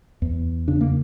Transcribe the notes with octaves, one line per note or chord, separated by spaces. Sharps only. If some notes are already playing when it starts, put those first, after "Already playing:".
E2
C#3 D4
A#3